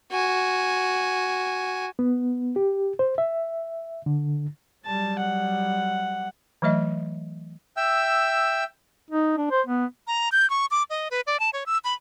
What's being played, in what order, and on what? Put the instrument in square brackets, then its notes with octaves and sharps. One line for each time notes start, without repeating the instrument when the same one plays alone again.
[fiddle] F#4 G#5
[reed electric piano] B3
G4
C5
E5
D3
[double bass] F#3 G3 [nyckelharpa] A5
[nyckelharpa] F#5
[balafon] E3 F#3 A3 D#5 E5
[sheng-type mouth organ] E5 G5 E6
[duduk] D#4
D4
C5
B3
[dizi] A#5
G6
C#6
D6
D#5
B4
D5
A5
C#5
E6
B5